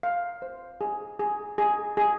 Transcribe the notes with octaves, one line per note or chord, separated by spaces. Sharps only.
F5
C5
G#4
G#4
G#4
G#4